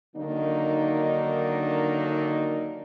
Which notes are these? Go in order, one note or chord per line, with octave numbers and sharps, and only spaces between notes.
D3 D#3 F#3 A#3 D4 D#4